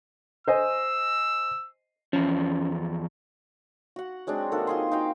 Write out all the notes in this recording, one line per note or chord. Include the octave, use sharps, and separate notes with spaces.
C5 D#5 G#5 E6
E2 F3 C#4
F#4 F#5
F#3 G#3 C4 D4
D#3 A#3 F#4 A4
F4 G#4 C6
D#4 F#4 F5 G5